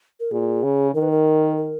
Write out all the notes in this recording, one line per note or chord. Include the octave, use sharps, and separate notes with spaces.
A#4
A#2 G#4
C#3
D#3 A#4
B4
A#4
A#4